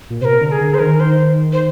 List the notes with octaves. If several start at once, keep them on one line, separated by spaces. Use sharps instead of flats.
A#2
C3 A#4 C5
D3
A#4
G#4
D3
C5
D#3 A#4
C5
C5